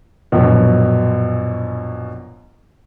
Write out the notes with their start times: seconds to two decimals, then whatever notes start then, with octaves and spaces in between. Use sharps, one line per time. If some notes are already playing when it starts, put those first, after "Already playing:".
0.32 A#1 F#2 B2